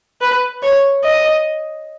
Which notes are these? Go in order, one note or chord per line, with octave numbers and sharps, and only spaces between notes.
B4
C#5
D#5